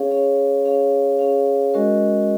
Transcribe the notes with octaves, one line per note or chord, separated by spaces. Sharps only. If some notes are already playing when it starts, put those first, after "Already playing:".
Already playing: C#4 G#4 C#5 F5
C#4 G#4 C#5 F5
C#4 G#4 C#5 F5
C#4 G#4 C#5 F5
G#3 C#4 F#4 A#4 D#5